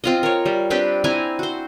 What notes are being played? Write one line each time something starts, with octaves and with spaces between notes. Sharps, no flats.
C4 F4 D#5
A#4 C#5
G3
C4 D4 G4 B4
C4 E4 G#5 A#5
F#4 C5